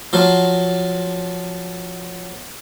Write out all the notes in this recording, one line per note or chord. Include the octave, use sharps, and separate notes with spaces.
F3 F#3 F5